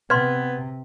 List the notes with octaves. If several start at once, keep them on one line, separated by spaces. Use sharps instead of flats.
C3 B3 B4 C6 G#6